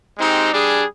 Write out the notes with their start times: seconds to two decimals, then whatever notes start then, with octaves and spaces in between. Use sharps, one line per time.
0.18 G#3 C4 D#4 G4
0.52 G3 D4 G#4